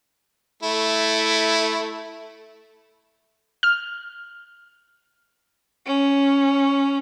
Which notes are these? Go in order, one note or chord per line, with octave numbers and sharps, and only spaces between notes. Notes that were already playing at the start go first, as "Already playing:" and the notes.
A3 E4
F6
C#4